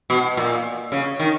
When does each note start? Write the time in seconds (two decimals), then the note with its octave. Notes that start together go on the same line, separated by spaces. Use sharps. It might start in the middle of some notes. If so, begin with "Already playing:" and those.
0.10 B2
0.37 A#2
0.92 C#3
1.20 D#3